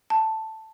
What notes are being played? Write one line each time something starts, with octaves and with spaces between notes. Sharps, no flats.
A5